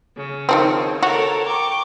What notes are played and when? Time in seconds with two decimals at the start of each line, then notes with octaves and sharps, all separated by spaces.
0.17 C#3
0.49 D#3 F3 C4
1.03 F#4 A4 A#4 C#5
1.43 G5 C#6 D6